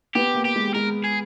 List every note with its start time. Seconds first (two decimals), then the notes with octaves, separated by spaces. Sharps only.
0.15 B3 G4
0.35 A#3
0.45 G4
0.56 G#3
0.75 G#3 A#4
1.05 G#4